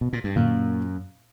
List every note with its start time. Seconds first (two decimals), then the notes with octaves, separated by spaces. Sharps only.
0.01 B2
0.13 A#2
0.24 G2
0.36 F#2 A#2